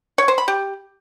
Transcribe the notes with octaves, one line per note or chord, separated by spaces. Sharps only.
C#5
C5
B5
G4